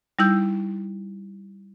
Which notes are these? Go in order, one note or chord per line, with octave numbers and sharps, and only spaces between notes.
G3 D#4 E4 E6 G6